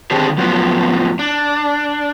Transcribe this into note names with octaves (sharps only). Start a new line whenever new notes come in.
D3 D#3 C4 D4 G4 G#4
F#2 A2 F3 F#3 B3
D4